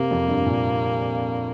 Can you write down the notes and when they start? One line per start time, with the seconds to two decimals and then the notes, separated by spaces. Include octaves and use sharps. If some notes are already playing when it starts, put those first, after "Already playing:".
Already playing: C3 A#3
0.11 F2
0.28 G2
0.46 A#2